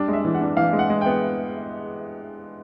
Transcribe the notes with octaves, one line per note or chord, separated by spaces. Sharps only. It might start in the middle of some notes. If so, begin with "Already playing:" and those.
Already playing: G3 D4
G#3
E5
E3
F#5
D4
E3 F5
G#3
F#5
G#3
G5
B3